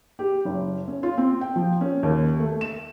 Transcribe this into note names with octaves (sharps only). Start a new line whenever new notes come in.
G4
F#1
C#4
F4
C4
G5
F3
C#4
D#2
A3
E7